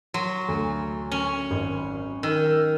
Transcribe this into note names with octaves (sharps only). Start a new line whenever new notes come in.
F#3 C6
D2
C#4
G#1
D#3 E6